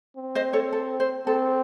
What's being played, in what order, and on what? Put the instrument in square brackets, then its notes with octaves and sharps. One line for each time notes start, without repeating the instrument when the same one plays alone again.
[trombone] C4
[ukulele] C5 D#5
A4 C#5
A4
C5
[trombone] C4 [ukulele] A4